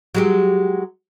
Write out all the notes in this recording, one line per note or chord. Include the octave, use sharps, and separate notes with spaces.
F#3 G#3 G4